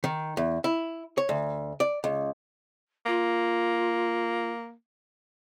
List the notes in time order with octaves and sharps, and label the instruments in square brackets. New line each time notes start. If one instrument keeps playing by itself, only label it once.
[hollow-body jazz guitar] D#3
E2
E4
C#5
D2
D5
C#2
[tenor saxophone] A#3 [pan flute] F4